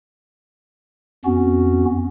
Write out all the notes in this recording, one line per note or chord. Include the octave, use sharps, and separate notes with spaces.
F2 B3 C#4 F#4